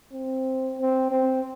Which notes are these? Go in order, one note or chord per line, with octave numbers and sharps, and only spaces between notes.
C4
C4
C4